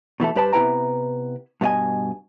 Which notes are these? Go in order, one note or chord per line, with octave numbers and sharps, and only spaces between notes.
B2 E3 A3 A4
G2 G4 B4 C5 A5
C3 B3 E4 B4 G5 A#5
G2 B2 D#4 D#5 G#5